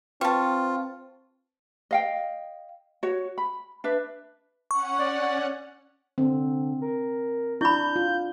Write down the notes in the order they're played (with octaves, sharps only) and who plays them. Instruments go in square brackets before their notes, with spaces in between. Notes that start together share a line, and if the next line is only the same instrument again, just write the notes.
[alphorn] C4 [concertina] F4 [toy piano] G#4 B4 G5 [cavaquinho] A5 C#6
[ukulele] D#5 F5 G5
F#4 C#5
B5
D4 B4 E5
[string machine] C#4 F#5 [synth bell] C#6
[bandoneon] D5
[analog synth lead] D3 [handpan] C4
[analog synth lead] A#4
[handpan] D4 [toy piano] E4 B5 [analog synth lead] G6
[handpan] F4